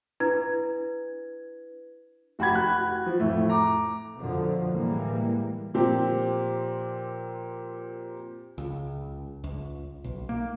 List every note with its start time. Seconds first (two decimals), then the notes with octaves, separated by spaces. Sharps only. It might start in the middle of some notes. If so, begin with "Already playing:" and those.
0.20 D4 E4 B4 G#6
2.39 F1 F#4 G4 B5 G#6
2.54 B5 F#6
2.79 F#4
3.06 F3
3.19 F2 A2 A3
3.49 A#5 D6
4.17 F2 B2 D3 F3
4.73 A2 E3 G3 G#3 A#3
5.74 A#2 F3 C4 G4
8.58 C#2
9.44 C#2
10.04 B1
10.29 A#3